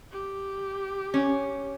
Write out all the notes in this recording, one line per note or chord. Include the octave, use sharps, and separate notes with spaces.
G4
C#4